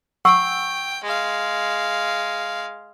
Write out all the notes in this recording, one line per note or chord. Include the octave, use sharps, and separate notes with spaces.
F#5 G5 C#6 E6
G#3 F5